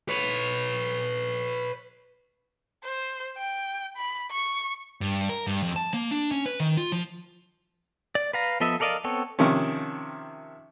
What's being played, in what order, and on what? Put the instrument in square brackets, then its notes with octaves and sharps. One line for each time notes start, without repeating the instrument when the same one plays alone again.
[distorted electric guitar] B4 C#5
[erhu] C5
G5
B5
C#6
[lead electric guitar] G2
A#4
G2
F2
A5
A#3
D4
C#4
B4
D#3
F4
F3
[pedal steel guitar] D5
B4 F5 A#5
F3 B3 A4 D#5 E5
A4 A#4 D5 D#5 F5
B3 C4 A4 C#5
[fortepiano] C3 D#3 F3 C#4